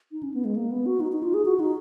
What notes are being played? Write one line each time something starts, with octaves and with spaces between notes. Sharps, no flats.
D#4
C#4
B3
G#3
A#3
B3
F#4
D#4
D#4
F4
G#4
F#4
D#4